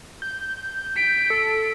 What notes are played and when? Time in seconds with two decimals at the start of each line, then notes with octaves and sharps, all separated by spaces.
0.22 G6
0.96 B6 D7
1.30 A4